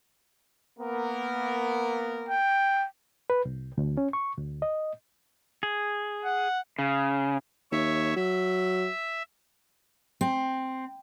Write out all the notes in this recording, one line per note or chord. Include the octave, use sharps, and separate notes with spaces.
A#3 B3 A#4
G5
B4
C2
D2
C#4
C#6
D2
D#5
G#4
F#5
C#3
D#2 C#5 E5
F#3 E5
C4